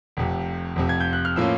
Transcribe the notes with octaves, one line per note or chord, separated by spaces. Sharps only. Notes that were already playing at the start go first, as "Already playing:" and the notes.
F1 F2 C3
F1 F2 C3
G#6
G6
F#6
F6
A2 F3 A#3 C#4 E6